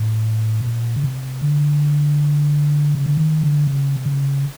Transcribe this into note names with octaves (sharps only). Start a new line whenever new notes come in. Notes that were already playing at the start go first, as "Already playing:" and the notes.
Already playing: A2
B2
A#2
C#3
C3
D3
C#3
D3
D#3
D3
C#3
C3
C#3